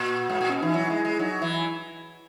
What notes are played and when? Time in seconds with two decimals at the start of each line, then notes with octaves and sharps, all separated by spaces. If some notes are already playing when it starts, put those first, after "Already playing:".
Already playing: A#2 F#4
0.30 G#2
0.41 A#2
0.50 B2 C#4
0.62 E3 D#4
0.74 F#3 E4
0.90 G#3
1.05 G#3
1.19 F#3 D#4
1.42 E3 E4